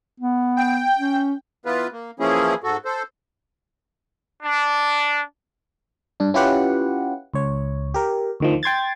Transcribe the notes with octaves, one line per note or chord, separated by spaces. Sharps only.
B3
G5
C#4
E3 B3 F4 B4
A#3
E3 F3 A#3 C#4 E4 G#4
G#2 F#4 A4
A4 C5
D4
G2 D4
C#4 E4 F4 G4 B4 F#5
C#2 C#5
G4 A#4
D2 D#3 F3
G5 C6 G#6 A6